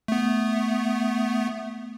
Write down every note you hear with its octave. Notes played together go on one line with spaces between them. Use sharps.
A3 B3